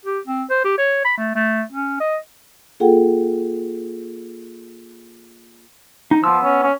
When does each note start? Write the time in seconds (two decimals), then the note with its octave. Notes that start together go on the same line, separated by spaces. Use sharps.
0.05 G4
0.27 C4
0.50 C5
0.64 G4
0.78 C#5
1.05 B5
1.17 A3
1.36 A3
1.72 C#4
2.00 D#5
2.80 A#3 F4 G#4 A4 F#5 G5
6.11 D#4
6.24 F3 B3 E6
6.43 C#4
6.63 C#4